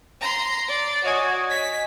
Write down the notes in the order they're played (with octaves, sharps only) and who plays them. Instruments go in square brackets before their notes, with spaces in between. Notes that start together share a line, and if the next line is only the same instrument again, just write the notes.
[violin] A#5 C6
D5
[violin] F#4 [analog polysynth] C#5 D#5 G#5
[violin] B6